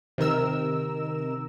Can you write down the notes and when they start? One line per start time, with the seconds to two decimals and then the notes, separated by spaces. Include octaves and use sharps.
0.18 C3 D#3 A#4 E6